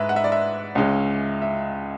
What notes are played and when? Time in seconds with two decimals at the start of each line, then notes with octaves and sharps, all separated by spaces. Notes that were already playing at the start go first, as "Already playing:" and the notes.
Already playing: G#2 G#3 B4 E5
0.09 F#5
0.16 E5
0.24 D5
0.32 E5
0.75 C#2 C#3 G#3 C#4
1.42 E5